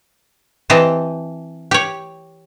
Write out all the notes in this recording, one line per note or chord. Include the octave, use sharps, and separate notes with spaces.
E3 C4 G4 D#5 A5
G4 C#5